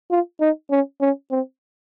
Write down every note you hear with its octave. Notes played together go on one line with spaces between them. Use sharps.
F4
D#4
C#4
C#4
C4